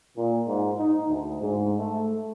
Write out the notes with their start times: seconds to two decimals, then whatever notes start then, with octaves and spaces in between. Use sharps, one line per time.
0.16 A#2
0.46 G#2
0.78 D#4
1.08 D2
1.40 G#2
1.79 A3